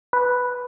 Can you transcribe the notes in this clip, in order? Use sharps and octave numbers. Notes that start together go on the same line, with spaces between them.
B4